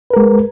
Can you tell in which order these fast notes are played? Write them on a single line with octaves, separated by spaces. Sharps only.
B4 A#4 G#3